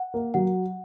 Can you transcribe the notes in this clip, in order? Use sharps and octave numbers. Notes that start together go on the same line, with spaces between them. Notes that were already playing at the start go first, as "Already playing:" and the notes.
Already playing: F#5
A#3
F#3 F#5